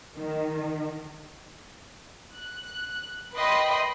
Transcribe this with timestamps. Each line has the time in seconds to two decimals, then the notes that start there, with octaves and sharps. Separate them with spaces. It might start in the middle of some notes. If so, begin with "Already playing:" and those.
0.17 D#3
2.36 F#6
3.35 B4 D#5 G5 B5 C6